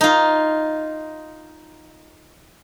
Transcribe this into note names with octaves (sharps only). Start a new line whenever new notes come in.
D#4 F4